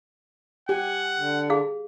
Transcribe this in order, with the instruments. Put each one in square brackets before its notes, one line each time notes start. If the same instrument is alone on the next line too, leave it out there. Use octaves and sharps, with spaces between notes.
[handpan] G4 [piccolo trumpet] F#5 [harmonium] G#5
[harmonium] D3
[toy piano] G#4 F5